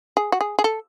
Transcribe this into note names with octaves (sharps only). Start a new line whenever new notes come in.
G#4
F#4
G#4
G#4
A4